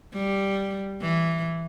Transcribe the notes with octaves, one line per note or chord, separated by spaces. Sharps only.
G3
E3